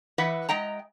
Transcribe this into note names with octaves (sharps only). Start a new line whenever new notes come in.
E3 B4 D#5 E5 F#5
G#3 D#5 G5 A#5